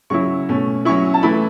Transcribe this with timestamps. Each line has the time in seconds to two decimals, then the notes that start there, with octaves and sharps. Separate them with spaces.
0.10 C#3 F#3 C#4 E4 C#6
0.49 B2 A3 C#4
0.85 F#3 C#4 E4 C#6
1.14 A5
1.23 E3 A3 E4 B5